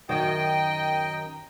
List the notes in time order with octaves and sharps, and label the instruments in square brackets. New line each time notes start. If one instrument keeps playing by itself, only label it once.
[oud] F#2 D#3 F#4 [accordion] D#5 G5